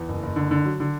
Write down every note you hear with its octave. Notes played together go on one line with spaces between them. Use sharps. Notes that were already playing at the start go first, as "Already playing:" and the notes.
Already playing: E2
F#1
F#1
D3
D3
F#3
D3